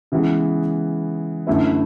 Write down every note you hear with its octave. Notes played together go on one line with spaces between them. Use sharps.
C#3 E3 G#3 B3
F#2 D3 A3 E4 B4